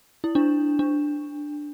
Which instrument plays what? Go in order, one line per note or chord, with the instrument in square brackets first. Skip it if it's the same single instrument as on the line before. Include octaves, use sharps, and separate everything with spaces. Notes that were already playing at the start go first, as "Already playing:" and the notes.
[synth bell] E4
D4
D4